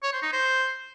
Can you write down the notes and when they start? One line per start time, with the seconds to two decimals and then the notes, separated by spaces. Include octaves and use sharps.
0.03 C#5
0.13 C5
0.23 D#4
0.32 C5